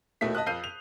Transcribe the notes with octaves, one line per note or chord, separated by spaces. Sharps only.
D#2 B2 A3 E4 B6
D#5 A5 D#6 F#6
F2 F5 G6 C7 D#7
F7